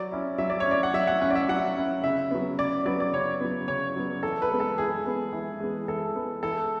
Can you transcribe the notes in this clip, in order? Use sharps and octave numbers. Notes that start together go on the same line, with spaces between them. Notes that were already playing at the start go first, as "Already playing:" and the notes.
Already playing: F#3 D5
C#4 E4
F#3 E5
D5
C#5
C#4 E4 D5
F#5
F#3 E5
F#5
C#4 E4 F#5
D5
E5
F#3 F#5
C#4 E4
C#3 E5
F#3 B3
C#3 D5
F#3 B3 D5
D5
C#3 C#5
F#3 B3
C#3 C#5
F#3 B3
E3 A4
B4
G#3 B3
A4
E3 G#4
G#3 B3
E3
G#3 B3
E3 A4
G#3 B3
E3 A4